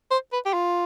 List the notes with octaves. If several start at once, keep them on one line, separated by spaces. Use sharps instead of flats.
C5
B4
G4
F4